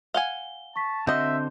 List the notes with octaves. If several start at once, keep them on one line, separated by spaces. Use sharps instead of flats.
F5 F#5 G#5 G7
A5 C#6 B6
D3 C4 F#4 D#5 E5 C6 G6